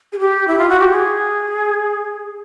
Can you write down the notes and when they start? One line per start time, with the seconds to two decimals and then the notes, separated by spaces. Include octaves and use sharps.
0.13 G#4
0.19 G4
0.47 E4
0.58 F4
0.69 F#4
0.80 G4
0.90 G#4